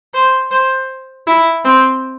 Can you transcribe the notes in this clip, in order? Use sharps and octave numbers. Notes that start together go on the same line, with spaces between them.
C5
C5
E4
C4